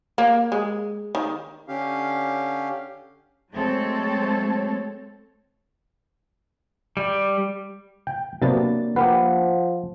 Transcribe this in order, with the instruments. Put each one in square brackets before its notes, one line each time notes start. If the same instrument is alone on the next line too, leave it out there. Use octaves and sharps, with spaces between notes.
[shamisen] A#3
G#3
D#3
[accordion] D3 C#4 G4 F5
[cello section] F#3 G#3 A3 C4 A4 C#5
[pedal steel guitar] G3
[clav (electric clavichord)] G5
[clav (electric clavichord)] C3 F#3 B3 [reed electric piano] A#3 D4 A6
[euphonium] F3 [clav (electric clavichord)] G4 A#4 B4 [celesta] F#5